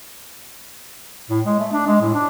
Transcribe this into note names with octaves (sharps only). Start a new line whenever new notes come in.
A2
G#3
A3
D4
G#3
A2
D4